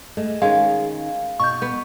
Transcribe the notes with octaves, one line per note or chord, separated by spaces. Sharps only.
G#3 A3
D#3 G#3 C#4 F5
B2 C#6 G6
B3